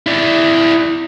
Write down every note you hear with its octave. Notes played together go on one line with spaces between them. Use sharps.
E4 D5